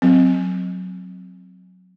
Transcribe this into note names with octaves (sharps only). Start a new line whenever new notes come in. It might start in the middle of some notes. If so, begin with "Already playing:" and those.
F#3 C4